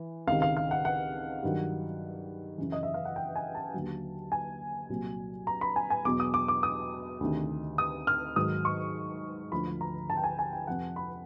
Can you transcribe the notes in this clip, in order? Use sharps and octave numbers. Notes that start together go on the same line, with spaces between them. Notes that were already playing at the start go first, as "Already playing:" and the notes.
Already playing: E3
C#2 C3 D#3 F5
F5
F5
F#5
F#5
G2 D#3 F#3
F#2 C#3 E3
D#5
E5
F5
F#5
G5
G#5
A5
D#2 D3 F#3
G#5
C2 A#2 F#3
A#5
B5
G#5
G#5
E2 B2 F#3 D6
D#6
D6
D6
D#6
D2 C3 D#3
D#6
F6
G#2 D#3 F#3 D#6
C#6
D2 D3 F3 B5
A#5
A5
G5
G#5
G#5
G5
F2 C3 F3 F#5
B5